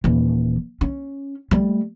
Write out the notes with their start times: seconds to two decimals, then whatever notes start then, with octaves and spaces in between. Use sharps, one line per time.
0.04 D#1 E3
0.81 C#4
1.51 G3 A3